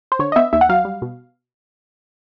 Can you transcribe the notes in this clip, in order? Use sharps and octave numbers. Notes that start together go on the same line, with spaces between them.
C5
D3 C#5
D#5
B3 E5
D#2 E5
F#5
F#3 F5
G3
B2